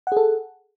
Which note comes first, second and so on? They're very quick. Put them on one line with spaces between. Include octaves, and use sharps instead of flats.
F#5 G#4 A4